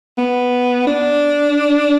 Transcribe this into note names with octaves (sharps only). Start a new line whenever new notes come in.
B3
D4